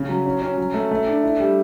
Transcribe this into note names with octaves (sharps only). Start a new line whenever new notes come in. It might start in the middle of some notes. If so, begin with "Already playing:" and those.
Already playing: C#3
F#3
C#4
C#4
F#3
A3
A3
D4
E4
G3